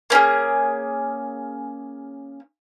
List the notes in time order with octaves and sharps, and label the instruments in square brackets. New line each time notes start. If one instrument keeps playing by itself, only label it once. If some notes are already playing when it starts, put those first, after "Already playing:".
[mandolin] A#3 C#4 F#4 G#4